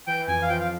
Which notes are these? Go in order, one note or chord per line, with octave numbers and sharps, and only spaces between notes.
E3 G5
F2 G#5
F5
F3 G5
F5